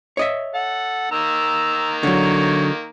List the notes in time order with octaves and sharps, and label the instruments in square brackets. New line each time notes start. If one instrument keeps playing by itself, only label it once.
[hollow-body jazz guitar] C#5 D#5 E5
[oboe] A4 [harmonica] F#5
[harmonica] D#3 A#3 A#5 [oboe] E6
[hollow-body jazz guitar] D3 F#3 [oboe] C#5